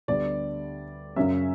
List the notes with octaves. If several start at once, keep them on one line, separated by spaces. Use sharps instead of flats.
D2 D3 G3 B3 D5
F#2 C#3 F#3 C#4 E5